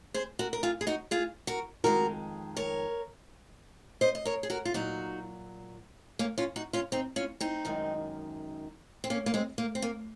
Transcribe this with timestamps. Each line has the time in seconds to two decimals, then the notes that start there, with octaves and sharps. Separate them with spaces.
0.14 G#4 C5
0.39 F#4 A#4
0.53 A#4
0.63 F4 G#4
0.81 G#4
0.87 D#4 F#4
1.11 F4 G#4
1.47 F#4 A#4
1.84 F2 D#3 G#3 F#4 A#4
2.57 A#4 C#5
4.01 C5 D#5
4.15 D#5
4.25 A#4 C#5
4.43 G#4
4.50 F#4 A#4
4.65 F4
4.74 A#2 F#3 D#4 F#4
6.19 A#3 C#4
6.38 C#4 F4
6.56 D#4 F#4
6.73 C#4 F4
6.92 C4 D#4
7.16 C#4 F4
7.40 C4 D#4
7.65 F#2 D#3 G#3
9.04 C4
9.10 A#3 C#4
9.26 A#3
9.34 G#3 C4
9.58 A#3
9.75 C4
9.82 A#3